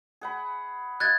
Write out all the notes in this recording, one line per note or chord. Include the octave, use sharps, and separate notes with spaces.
G#4 F#5 B5
D#5 F5 F#6 G#6 A6